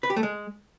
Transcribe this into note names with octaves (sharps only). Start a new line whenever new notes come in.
B4
G4
A3
G#3